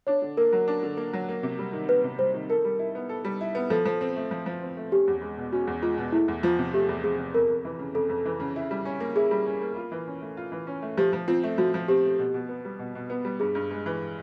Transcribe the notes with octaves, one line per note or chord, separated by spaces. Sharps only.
D4 C#5
D3
A#3 A#4
F#3
D4
D3
A#3
F#3
A#3
C3
G3
D#3
A#3 B4
C3
G3 C5
D#3
A4 A#4
G3
E4
B3
A4
G3
E4
B3
F3 A4
F3
C4
A3
F3
F3
C4
A3
C#4 G4
E2
G#3
B2
C#4 F#4
E2
G#3 F4
B2
A3 E4
E2
F3 F4
C3
A3 G4
E2
F3 G#4
C3
F2 A#4
F2
E3
C#3
F2 A4
F2
E3
C#3
E4
G3
C#4
A#3
E4 G#4
G3
C#4
A#3
F4
E3
C#4
A3
F4
E3
C#4
A3
F3 G4
F3
C4 F4
A3
F3 F#4
F3
C4 G4
A3
B2
B2
B3
G3
B2
B2
B3
G3
G2 G#4
G2
G#3
E3